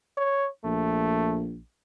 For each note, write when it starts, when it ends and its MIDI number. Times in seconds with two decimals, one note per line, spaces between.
0.18 0.49 73
0.64 1.59 34
0.64 1.44 57